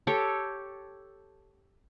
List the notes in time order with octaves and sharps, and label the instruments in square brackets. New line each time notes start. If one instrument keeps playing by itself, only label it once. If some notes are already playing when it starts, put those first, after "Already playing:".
[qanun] G4 A4 C#5